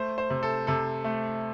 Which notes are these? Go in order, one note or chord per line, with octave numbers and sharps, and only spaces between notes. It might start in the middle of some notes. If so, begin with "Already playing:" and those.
Already playing: A3 C5
C5
C3
A4
C3 A4
A3